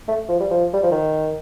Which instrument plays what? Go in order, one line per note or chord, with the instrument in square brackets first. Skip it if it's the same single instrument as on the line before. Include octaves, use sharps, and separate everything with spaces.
[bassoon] A3
F3
G3
F3
G3
F3
D#3